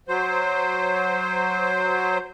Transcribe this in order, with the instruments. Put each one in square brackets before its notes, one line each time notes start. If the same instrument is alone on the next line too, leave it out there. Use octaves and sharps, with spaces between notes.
[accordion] F#3 C5